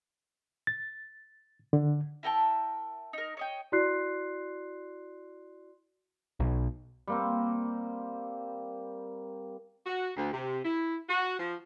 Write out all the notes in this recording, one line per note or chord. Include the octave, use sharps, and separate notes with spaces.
A6
D3
E4 A#4 G5 A5
D#4 A#4
C#5 D#5 G5
E4 F#4 D5 C6 F#6 C7
B1
G3 A#3 C4
F#4
D2
C3
E4
F#4
F3